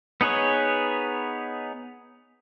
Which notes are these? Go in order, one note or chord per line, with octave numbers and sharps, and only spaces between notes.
B3 D#4 G#4 B4 C#5